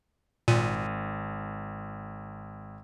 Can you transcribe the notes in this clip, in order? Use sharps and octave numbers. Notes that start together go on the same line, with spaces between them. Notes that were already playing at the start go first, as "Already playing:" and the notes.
G#1 A#2 D#7